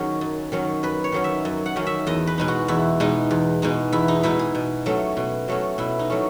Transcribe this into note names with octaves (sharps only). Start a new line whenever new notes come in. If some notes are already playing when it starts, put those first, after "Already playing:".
Already playing: D#3 F#3 C#4 G#4
F#2
D#3 F#3 C#4
F#2 B4
C#5
D#3 F#3 C#4
E5
F#2
F#5
D#3 F#3 C#4
E5
E2 D#5
B4
B2 G#3 D#4
F#4
E2 E4
B2 G#3 D#4
E2
B2 G#3 D#4
E2 E4
D#4
B2 G#3 D#4 E4
G#4
B2
F#3 A3 C#4
B2
F#3 A3 C#4
B2 E4
D#4
F#3 A3 C#4